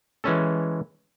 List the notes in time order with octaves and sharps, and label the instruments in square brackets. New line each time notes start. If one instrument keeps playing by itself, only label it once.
[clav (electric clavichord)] E3 G#3 C#4 A4